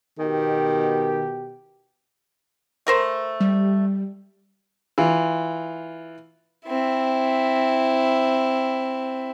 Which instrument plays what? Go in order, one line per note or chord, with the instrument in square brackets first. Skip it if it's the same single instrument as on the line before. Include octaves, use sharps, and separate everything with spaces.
[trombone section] B2 G4 [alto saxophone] D#3
[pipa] A3 A#4 C5
[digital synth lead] G3
[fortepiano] E3 F4
[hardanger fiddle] C4 E4